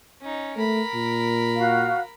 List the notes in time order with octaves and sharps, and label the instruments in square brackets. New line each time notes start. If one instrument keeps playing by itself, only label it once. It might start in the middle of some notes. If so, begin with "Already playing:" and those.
[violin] C#4 D#4
[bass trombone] A3 [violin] A#4 B5
[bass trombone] A#2
[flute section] F#4 F5